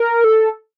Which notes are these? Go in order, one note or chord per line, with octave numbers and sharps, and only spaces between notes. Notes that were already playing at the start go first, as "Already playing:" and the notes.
Already playing: A#4
A4